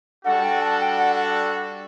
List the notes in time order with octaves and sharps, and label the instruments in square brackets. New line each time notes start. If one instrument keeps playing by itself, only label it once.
[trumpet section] G3 D4 F#4 A4 [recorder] F#5
[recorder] G5
A5
G5
F#5
F#5